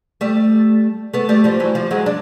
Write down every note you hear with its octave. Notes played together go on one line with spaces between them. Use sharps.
G3 A3
A3 B3
G3 A3
F3 G3
E3 F#3
F3 G3
F#3 G#3
D4